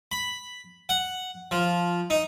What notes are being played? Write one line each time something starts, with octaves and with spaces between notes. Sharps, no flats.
B5
F#5
F3
D#4